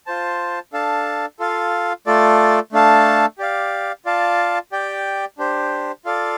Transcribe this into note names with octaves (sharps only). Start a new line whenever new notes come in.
F4 C5 A5
D4 A4 F5 A5
F4 A4 F5
A3 F4 A4 D5
A3 D4 A4 F5 A5
G4 D5 F5
F4 D5 F5 A5
G4 D5 G5
D4 G4 C5
F4 A4 D5 F5